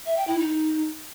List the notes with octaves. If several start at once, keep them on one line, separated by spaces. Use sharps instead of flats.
E5
G5
E4
D#4